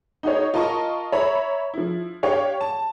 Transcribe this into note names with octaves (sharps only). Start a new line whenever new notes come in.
D#4 F#4 G#4 C#5
F4 A#4 D#5 A5 A#5 C#6
C#5 E5 A#5 B5
F3 E4
D4 G4 C#5 F5 G5 C#6
A5